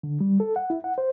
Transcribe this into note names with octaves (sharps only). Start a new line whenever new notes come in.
D3
G3
A4
F#5
E4
F#5
C5